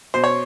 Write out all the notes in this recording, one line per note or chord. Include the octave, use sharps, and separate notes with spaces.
B2 C5
C#5